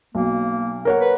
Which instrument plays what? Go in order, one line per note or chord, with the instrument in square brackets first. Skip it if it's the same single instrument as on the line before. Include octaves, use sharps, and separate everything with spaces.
[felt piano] B1 [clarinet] A#3
[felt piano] A#4 C#5 F#5
[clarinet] B4